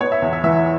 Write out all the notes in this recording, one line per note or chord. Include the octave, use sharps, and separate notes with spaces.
B3 C#5
E5
E2
E5
E3 E5